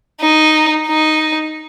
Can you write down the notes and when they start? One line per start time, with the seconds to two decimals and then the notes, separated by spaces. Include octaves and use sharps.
0.21 D#4
0.87 D#4